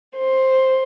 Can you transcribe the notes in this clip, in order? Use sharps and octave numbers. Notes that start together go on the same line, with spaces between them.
C5